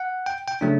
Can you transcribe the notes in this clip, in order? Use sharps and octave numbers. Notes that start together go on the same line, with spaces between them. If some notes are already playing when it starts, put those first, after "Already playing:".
Already playing: F#5
G5
G5
C#3 F#3 A3 D4